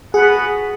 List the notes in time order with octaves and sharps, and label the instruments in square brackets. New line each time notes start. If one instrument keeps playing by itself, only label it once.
[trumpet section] B3 F#4 B4 F#5 [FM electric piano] G#4